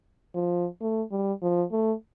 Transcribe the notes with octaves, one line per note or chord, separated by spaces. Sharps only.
F3
A3
G3
F3
A3